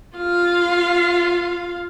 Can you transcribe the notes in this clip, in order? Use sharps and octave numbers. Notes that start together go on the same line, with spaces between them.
F4 F5